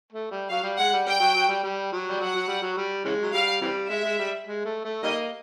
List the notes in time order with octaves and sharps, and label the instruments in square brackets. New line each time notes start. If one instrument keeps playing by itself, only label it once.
[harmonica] A3
G3
[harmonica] F#3 [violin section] F5
[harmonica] G3
[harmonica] G#3 [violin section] F#5
[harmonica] G3
[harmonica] G3 [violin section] G5
[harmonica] F#3
F#3
G3
G3
F#3
G3
[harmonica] F#3 [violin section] F#5
[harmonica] F#3
G3
F#3
G3
C#3 E3 G#3
F#3
[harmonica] G3 [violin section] F5
[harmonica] C3 E3 G3
[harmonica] G#3 [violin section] E5
[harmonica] G#3
G3
G#3
A3
A3
[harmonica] D#3 G3 A#3 [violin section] D#5